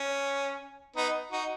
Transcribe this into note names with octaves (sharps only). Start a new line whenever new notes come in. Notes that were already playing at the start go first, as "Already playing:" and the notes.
Already playing: C#4
B3 D#4
D#4 F#4